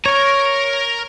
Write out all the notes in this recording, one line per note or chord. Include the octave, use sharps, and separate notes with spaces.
A#4 C#5 A#5